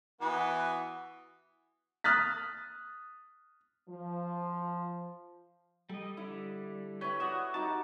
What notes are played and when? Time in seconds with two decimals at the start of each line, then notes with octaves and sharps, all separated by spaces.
0.21 E3 B3 F#4
2.04 D#6 F6 F#6 A6 B6
3.89 F3
5.89 G3 A4 D#5
6.17 D3 G3 E4
7.01 E4 G4 B4 C#5
7.20 F#4 B4 D5 E5 F#5 D#6
7.54 D#4 F#4 G4 A5 D6